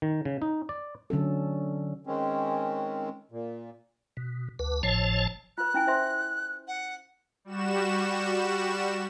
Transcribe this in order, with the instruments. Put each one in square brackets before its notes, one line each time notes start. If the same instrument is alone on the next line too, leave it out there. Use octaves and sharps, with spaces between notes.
[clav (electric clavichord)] D#3
C#3
D#4
D5
[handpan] D3 F#3 C#4 A4
[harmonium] D#3 G#3 C4 C#4
A#2
[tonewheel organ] B2
D2 B4
G#1 A2 F3 C#5 A5
[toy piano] F4 B4 [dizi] F#6
[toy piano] C#4 E4 G#5
C5 E5 C6
[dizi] F#5
[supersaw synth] G3 F#4 E7